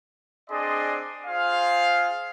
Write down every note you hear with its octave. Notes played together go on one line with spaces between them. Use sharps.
C4 D4 G#4 D5 D#5 C6
F4 G#4 C5 F5